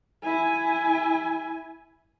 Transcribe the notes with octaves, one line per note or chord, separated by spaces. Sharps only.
E4 G#5